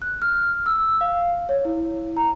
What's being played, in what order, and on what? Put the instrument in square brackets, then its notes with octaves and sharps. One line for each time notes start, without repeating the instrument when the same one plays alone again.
[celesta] F#6
F6
E6
F5
C#5
E4
A#5